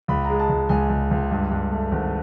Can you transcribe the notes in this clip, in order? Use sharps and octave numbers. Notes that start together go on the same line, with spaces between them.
C#2 B5
G#3 A#5
A5
C#2
C#2 G#5
C#2
C#2
G2
G2
A3
G#1